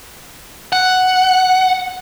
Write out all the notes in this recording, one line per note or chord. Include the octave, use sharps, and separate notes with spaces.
F#5